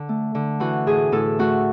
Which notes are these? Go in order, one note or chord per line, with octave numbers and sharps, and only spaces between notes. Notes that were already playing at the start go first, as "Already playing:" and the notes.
Already playing: D3
A3
D3
E3 F#4
A2 G#4
A2 A4
A3 F#4